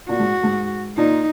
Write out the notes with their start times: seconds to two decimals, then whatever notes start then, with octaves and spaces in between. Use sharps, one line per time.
0.09 A#2 F#4
0.20 G#2
0.43 G#2
0.97 A#2 D#4